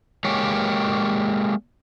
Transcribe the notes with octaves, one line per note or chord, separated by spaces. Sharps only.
G#3 A#3 G4 C#5